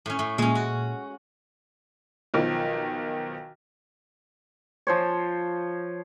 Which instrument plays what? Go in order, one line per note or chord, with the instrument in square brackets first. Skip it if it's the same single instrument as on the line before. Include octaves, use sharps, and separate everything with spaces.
[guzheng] A2 C#4
A2
[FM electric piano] A#2 [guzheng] G#3 C#4
[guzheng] F#4
[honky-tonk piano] B1 D#3 F3
[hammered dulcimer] F3 C5 C#5